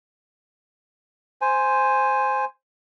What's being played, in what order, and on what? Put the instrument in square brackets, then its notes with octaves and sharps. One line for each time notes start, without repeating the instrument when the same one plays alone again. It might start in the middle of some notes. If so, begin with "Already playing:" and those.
[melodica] C5 G#5